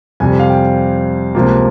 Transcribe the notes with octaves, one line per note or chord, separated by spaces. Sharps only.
F2 C3 G3 G#5
F5
G5
C#2 C3 F3 A#3